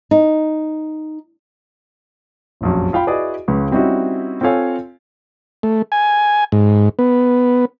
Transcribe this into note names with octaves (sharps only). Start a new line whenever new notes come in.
D#4
F1 A#1 F#2
F4 F5 G5 B5
E4 F#4 G#4 B4 D5 D#5
C#2 C#3 B4
G3 C4 C#4 D#4 E4 F#4
C4 F4 A4 C#5 F5 G#5
A3
G#5
G#2
B3